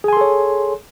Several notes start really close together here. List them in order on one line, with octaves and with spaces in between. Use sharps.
G#4 G#5 C6 A4 C#5